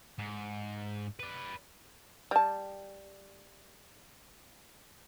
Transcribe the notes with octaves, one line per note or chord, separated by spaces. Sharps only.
G#2
B4 D5
G3 A5